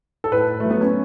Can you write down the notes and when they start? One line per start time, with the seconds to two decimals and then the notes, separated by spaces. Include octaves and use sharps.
0.24 A4
0.32 A2 B4
0.48 A2
0.60 A3
0.65 F#3
0.70 B3
0.81 C#4